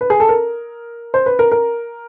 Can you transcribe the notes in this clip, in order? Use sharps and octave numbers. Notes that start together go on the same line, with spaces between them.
B4
G#4
A4
A#4
C5
B4
A#4
A#4